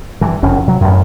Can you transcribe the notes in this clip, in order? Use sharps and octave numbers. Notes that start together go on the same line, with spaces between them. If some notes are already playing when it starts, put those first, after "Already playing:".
G2 E3
F#1 F2 C3 C#4
C3 F#3
A1 F#2